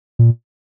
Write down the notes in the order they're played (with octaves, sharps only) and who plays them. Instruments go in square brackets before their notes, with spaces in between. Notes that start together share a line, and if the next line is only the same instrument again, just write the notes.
[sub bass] A#2